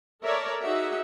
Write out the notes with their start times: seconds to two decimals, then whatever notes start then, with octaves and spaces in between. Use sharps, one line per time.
0.23 A4 A#4 C#5 D5 E5
0.63 D#4 F#4 G#4 E5 F#5